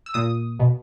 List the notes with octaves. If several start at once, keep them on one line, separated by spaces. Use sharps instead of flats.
E6
A#2 D#6
B2